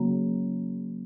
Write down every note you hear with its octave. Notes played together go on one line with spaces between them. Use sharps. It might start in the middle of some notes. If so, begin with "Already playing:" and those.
Already playing: C#3 F#3 A#3 C#4